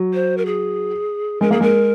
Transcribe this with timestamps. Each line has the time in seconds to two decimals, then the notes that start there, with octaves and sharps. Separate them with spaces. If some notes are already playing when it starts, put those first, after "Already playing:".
Already playing: F#3
0.14 C5
0.37 A#4
0.46 G#4
1.41 G#3 A#4
1.51 A#3 G#4
1.60 G#3 A#4